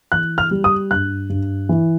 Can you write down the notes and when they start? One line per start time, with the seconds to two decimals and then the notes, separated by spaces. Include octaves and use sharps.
0.12 E3 F#6
0.38 F6
0.51 G3
0.64 D#6
0.91 G2 F#6
1.30 G2
1.69 E3